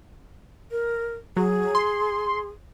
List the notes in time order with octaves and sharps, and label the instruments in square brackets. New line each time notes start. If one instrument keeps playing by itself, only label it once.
[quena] A#4
[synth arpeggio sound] F#3 [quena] G#4
[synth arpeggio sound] C6